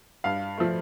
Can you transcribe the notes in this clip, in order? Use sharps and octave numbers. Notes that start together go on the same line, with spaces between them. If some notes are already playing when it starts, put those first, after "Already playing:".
G2 F5
F3 A3